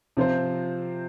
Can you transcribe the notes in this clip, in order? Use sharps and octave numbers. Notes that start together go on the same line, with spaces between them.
C3 F3 C4 F4 C5